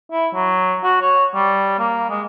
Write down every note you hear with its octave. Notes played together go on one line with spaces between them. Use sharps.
E4
F#3
F#4
C#5
G3
A#3
G#3